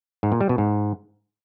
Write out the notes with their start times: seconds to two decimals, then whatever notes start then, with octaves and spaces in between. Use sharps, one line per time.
0.23 G#2
0.32 A#2
0.41 G3
0.49 B2
0.58 G#2